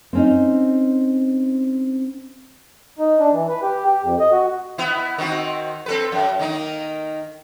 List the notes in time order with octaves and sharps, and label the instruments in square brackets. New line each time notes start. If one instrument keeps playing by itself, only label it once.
[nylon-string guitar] C4 C#4 D#4
[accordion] D#4
D4
E3
B4
G4
G4
F2
D#5
F#4
[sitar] B3 E4
D#3 C4 F#4
C4 A4 B4
F#2
D#3 A#3 D#4